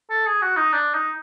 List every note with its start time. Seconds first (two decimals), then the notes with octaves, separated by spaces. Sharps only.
0.10 A4
0.26 G#4
0.42 F#4
0.57 D#4
0.73 D4
0.94 D#4